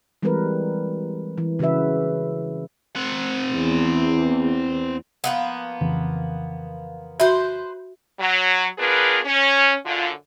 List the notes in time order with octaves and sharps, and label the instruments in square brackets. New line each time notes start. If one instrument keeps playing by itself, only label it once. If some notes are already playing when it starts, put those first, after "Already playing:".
[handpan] E3 G3 G#3 C4 A#4 B4
E3
C#3 E3 F#4 B4 E5
[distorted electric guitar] C4 F#5
[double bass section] E2
[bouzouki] F3 A#3 B3
[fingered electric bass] F2 C#3 E3
[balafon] F#4 E5 [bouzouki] B4 C5
[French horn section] F#3
B3 D4 F4 G#4 A#4 B4
C#4
F#2 D3 F4